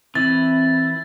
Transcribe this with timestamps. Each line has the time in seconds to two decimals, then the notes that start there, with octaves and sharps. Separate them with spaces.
0.15 E3 C4 E4 A6